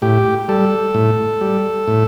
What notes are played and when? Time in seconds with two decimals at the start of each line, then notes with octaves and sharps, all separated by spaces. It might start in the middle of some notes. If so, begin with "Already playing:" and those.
0.02 A2 G4
0.49 G3 A4
0.94 A2
1.41 G3
1.88 A2